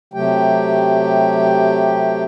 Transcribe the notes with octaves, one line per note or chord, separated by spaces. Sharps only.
C3 F#3 A3 G4 G5